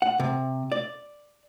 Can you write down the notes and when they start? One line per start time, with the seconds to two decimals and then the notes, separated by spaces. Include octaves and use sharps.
0.02 F#5
0.20 C3
0.72 D5